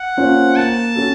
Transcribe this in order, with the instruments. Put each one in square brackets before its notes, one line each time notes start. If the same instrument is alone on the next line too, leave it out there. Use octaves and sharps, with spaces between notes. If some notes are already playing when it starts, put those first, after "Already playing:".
Already playing: [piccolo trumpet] F#5
[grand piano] A#3 C#4 F4 C5
[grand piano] A#3 [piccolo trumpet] A5
[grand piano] C#4 F#4 A4